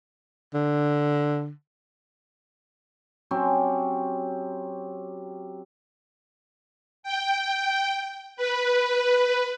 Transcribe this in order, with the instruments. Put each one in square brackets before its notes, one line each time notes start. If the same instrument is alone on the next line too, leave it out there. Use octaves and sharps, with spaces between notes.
[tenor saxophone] D3
[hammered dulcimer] F#3 C4 C#4 G4
[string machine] G5
B4